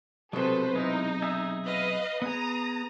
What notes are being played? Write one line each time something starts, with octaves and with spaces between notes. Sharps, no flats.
B1 C3 F#3 G#3 A4 B4 C5
G#3 D#4 E4
G#4 E5
B4 D#5 F5
B3 G#4 A#5 D#6